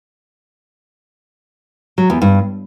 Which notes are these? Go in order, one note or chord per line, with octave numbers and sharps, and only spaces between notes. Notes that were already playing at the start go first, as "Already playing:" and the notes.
F#3
E2
G2